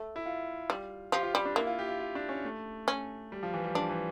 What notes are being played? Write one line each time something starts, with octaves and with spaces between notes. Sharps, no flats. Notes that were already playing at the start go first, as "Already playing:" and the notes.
Already playing: A3
E4
F4
G3
F3 G4
F4
G3 F4
D4
A#3 E4
F4
G4
F4
F4
D4
C#4
A3
C#4
G3
F3
E3
G3
F3 D4
E3